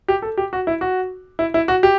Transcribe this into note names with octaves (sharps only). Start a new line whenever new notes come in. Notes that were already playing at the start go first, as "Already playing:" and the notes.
G4
A4
G4
F#4
E4
F#4
E4
E4
F#4
G4